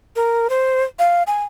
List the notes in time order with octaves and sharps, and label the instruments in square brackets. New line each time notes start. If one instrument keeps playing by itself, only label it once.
[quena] A#4
C5
F5
G#5